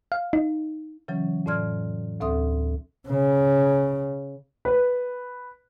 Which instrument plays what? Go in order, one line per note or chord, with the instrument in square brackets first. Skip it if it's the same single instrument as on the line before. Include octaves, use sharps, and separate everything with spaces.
[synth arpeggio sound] F5
D#4
[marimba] C#3 E3 F#3 C#4
F2 A2 D5 C6 F6 G#6
D2 C4 A4 E5 C6 D#6
[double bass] C#3
[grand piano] B4